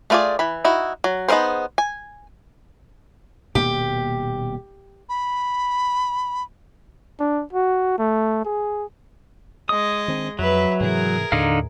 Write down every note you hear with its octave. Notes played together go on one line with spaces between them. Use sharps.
A3 B3 F4 G#4 D5
E3 B5
D#4 E4 F#4
F#3
B3 D#4 G#4 A#4 C5
G#5
D#1 B2 A#3 G4
B5
D4
F#4
A3
G#4
G#3 D#5 D#6
D#3 C4 D4
F2 F#3 B4 E5
G#2 C3 E3 G#4 A#4
D#2 A2 D3 D#4 F5